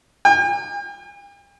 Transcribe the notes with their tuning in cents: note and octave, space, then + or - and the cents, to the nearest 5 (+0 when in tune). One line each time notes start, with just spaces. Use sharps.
G5 +45